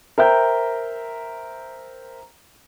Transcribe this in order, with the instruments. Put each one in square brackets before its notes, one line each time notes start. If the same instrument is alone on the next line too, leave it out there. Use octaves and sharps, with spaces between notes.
[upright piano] A#4 C5 E5 G5 A#5 G6